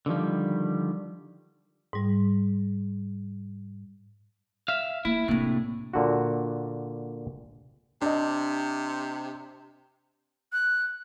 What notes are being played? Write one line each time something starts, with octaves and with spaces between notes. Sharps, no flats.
D3 D#3 F3 G3
G#2 G3
E5 F5
A#3 E4
A2 C3 A#3 D4
A#2 D3 F#4
C3 D4 D#5
F#6